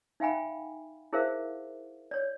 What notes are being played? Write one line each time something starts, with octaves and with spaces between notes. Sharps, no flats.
D#4 E5 F5 G5 G#5 B5
E4 G#4 A#4 C5 E5 F5
C#5 D5